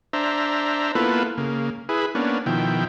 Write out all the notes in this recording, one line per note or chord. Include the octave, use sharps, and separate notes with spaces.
D4 C5 E5 A#5
A#3 B3 E4 F4 A4 B4
C#3 A#3
E4 G#4 B4
A#3 B3 C#4 D4
B2 D#3 F3 E4 G5